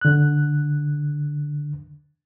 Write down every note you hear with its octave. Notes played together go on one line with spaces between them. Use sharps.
D3 F#6